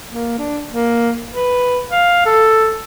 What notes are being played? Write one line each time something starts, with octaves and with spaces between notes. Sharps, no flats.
A#3
D4
A#3
B4
F5
A4